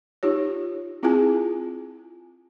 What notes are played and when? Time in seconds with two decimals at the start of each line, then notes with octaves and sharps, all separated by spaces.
0.23 D#4 F4 G4 C#5
1.03 C4 E4 F4 G#4 G#5 A5